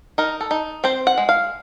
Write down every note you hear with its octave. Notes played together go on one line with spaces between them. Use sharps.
D#4 A#4
A4
D#4
C4 C5
F#5
G#3
F5